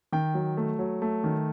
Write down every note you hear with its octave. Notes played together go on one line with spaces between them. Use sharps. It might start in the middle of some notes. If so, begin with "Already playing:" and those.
D#3 G5
F#3
A3
F#3
A3
D#3